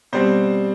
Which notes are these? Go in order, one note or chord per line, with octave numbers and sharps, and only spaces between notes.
B2 G3 C4 C5